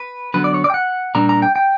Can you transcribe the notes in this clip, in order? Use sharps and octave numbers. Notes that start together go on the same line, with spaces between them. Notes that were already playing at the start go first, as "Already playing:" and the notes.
Already playing: B4
D3 F#3 B3 B4
D5
C#5
D5
G5
F#5
A#2 G3 A#3 D4 A#5
A#5
G5
G5